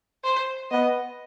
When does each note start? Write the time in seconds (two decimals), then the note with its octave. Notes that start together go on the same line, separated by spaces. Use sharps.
0.24 C5
0.71 B3 D#5